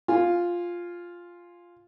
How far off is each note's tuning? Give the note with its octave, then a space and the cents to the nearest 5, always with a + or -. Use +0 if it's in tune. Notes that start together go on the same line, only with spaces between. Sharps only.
F4 +0 G#5 -10